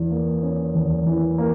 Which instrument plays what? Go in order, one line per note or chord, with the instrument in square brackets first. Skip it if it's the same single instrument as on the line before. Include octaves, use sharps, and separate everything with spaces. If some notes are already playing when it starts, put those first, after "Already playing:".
Already playing: [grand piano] E2 E3
A#3
C#4
E2
E3
A#3